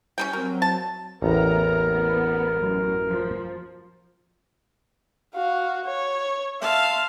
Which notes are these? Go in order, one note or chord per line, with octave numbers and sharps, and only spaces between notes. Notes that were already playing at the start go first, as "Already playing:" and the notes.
G3 C#4 D#4 G5
F#3 C4 A#4
A5
A1 E2 B3 A#4 A#5
B3
F#2
F3
F#4 F5
C#5
E5 F5 A5 C6